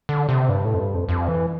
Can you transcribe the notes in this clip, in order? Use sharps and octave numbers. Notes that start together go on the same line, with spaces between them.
D3
C3
G2
A2
F2
G2
F2
F2
E3